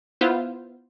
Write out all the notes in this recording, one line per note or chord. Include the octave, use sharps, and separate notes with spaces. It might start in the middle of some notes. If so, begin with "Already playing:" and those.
B3 E4 F4 C5